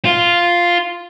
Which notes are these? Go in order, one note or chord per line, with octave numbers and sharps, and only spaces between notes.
F4